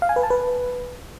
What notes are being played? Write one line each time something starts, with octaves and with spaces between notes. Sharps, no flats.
F5
G#5
B4
A5
B4